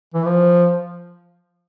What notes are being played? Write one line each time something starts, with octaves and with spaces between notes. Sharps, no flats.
E3
F3